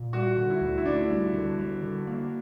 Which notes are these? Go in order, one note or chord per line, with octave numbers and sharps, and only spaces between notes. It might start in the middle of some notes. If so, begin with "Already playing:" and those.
Already playing: A#2
G3 F#4
D3
E4
D2
E4
D2 D4
G3
D3
G3
D3
A#3